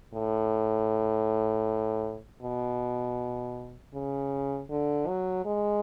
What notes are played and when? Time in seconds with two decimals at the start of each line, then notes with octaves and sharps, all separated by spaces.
0.14 A2
2.43 B2
3.93 C#3
4.70 D3
5.07 F#3
5.45 G#3